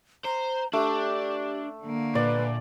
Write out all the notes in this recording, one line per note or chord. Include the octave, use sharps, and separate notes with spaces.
C5 A#5
A3 D4 G4
D3 A#3
A#2 B4 D5